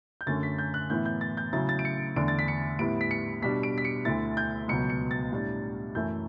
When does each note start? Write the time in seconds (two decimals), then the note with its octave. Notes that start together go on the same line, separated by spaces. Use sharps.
0.21 G6
0.26 F#2 D3 A3 C#4 A6
0.43 B6
0.59 G6
0.74 F#6
0.90 A2 E3 B3 E4 G6
1.05 G6
1.21 A6
1.37 G6
1.53 C#3 F#3 A3 E4 A6
1.69 A6
1.79 D7
1.85 C#7
2.16 E2 D3 A3 D4 D7
2.28 A6
2.39 B6
2.48 C#7
2.79 A2 G3 B3 E4 D7
3.01 B6
3.11 C#7
3.42 B2 G3 D4 B6
3.63 D7
3.78 B6
3.85 C#7
4.05 D2 D3 A3 E4 A6
4.37 G6
4.68 C#2 B2 F#3 B3 C#7
4.90 C#7
5.11 A6
5.32 A2 G3 D4
5.95 F#2 E3 A3 E4 G6